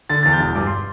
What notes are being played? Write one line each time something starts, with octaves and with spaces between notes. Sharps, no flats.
D3 A6
E2 A6
G6
E1
G2 D6
C6